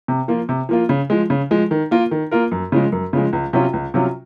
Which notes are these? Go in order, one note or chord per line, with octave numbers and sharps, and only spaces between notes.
C3
F3 A#3 F4
C3
F3 A#3 F4
C#3
F3 G#3
C#3
F3 G#3
D#3
A#3 F4 A#4
D#3
A#3 F4 A#4
F#2
C#3 F3 G#3
F#2
C#3 F3 G#3
C#2
C3 F#3 C#4 F4
C#2
C3 F#3 C#4 F4